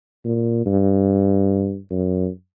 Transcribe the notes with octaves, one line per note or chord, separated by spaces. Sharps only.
A#2
G2
F#2